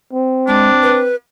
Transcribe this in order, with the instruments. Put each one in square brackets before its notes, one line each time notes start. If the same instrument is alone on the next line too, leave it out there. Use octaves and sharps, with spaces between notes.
[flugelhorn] C4
[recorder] G#3 [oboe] D4
[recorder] B4